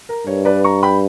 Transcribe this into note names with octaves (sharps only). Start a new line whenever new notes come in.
A#4
G2 A#4 C#5
B4 D5
A#5 C#6
G5 B5